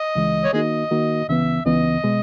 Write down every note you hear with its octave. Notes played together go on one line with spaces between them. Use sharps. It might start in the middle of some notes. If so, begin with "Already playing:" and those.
Already playing: D#5
C#2 C#3 E3 G#3
C#5
D#3 A#3 D#4 F#4 G#4 D#5
D#3 A#3 D#4 F#4
C#2 C#3 E3 B3 E5
C#2 C#3 E3 B3 D#5
B2 G#3